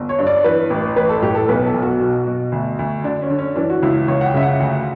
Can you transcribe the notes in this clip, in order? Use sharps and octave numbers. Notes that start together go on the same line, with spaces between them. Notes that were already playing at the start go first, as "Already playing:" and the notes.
Already playing: G1
C#5
G2
D5
E3 B4
A1
A1 B4
A4
A2 G4
A4
B1 B4
A4
B1
F#4
B2 F#4
B2
D2
D2
D3 D4
C#4
D3
C#4
E3 D4
F#4
C#2 E4
C#2 C#5
F#5
G5
C#3 E5
F#5
D2